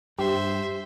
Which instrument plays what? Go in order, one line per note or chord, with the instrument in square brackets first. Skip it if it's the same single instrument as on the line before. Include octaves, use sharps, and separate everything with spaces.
[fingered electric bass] G2 [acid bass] G4 [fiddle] C5 E5